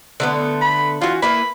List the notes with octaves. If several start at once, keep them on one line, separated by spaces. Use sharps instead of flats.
D3 A3 B3
B5
E3 F4 F#4
A#3 E4 B4 B5